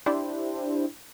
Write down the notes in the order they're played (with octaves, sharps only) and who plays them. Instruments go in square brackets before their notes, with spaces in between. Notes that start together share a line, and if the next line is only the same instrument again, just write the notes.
[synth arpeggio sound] D4 E4 G4 C5